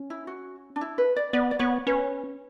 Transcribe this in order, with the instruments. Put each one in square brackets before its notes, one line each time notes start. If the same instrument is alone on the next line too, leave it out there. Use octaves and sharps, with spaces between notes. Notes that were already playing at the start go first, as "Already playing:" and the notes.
Already playing: [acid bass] C#4
[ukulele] E4
F#4
D4
E4
B4
D5
[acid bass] B3 [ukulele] D5
[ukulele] D5
[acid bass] B3 [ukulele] C#5
[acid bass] C#4 [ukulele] B4